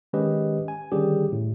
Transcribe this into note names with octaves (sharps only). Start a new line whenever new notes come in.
D#3 G#3 C#4 G4 B4 D#5
G#5
D3 D#3 G3 C#4 G4 G#4
A2